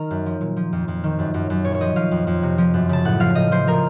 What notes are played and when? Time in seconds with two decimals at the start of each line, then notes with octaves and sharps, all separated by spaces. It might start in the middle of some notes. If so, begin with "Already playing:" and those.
Already playing: D#3 A#4
0.10 F#2
0.26 F3
0.41 A#2
0.57 F3
0.73 F2
0.88 F2
1.04 D#3
1.19 F#2
1.34 F#2
1.50 F#2
1.65 A#2 C#5
1.75 C#5
1.81 F3 D#5
1.96 F3 F5
2.11 F2
2.27 F2
2.43 C3
2.58 F3
2.74 F#2
2.89 C#3 A5
3.05 A2 F#5
3.20 F3 F5
3.35 A2 D#5
3.51 F3 C5
3.67 F3 A#4